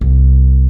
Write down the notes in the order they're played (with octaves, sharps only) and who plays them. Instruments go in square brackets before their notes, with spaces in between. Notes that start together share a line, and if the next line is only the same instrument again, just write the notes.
[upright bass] C2